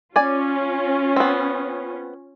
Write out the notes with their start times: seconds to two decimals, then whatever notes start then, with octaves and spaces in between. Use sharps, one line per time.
0.16 C#4 F4 D5 G#5
1.16 B3 C4